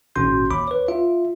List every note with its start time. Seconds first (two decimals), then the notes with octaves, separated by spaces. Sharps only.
0.16 G#1 A#2 C#4 F#4 C6 G6
0.51 D#2 B5 D6
0.68 B4 C#5
0.88 F4 E5